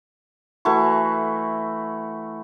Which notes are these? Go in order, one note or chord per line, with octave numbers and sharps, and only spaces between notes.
E3 A3 F#4 C#6